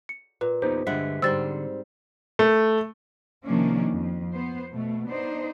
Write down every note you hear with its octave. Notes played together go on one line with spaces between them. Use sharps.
C#7
A#2 B4
B3 D#4 G4 C5
G2 D3 G#3 E5 F#5
G#2 D3 G3 C4 E6 A6
A3
C3 D#3 F3 A#3 C#4 D4
F2
B3 C5
B2 A3
B3 D4 D#4 C5